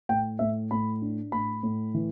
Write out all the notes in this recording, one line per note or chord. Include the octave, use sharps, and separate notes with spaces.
A2 G5
A2 E5
A2 B5
D4
A2 B5
A2
E3